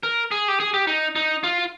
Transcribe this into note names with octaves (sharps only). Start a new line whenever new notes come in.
A#4
G#4
G4
G#4
G4
D#4
D#4
F4